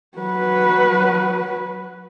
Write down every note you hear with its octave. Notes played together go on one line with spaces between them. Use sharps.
F#3 B4